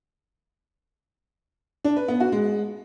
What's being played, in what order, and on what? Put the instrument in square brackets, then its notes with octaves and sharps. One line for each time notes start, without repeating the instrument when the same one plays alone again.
[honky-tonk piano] D4
B4
B3
F#4
G#3